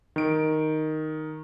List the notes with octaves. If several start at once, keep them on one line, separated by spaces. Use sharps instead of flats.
D#3 D7